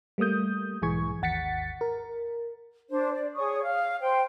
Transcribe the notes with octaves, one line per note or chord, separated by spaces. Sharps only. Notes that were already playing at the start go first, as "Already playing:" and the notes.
G3 A3 A#3 D#6 G6
B1 G#2 E3 G#4 C#6 G#6
G#1 D#2 F#5 A6 B6 C#7
A#4
D4 C5
D5
G#4 C#5 C#6 D#6
F5
C5 G5